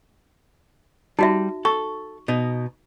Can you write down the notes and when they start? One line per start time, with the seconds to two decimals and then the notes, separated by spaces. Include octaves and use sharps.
1.19 G3 D#4 F#4 E5
1.65 A4 C#6
2.28 B2 D#4